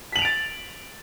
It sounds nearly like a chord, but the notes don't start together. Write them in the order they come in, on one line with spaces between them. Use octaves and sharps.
B6 F#7 F7 D7 A6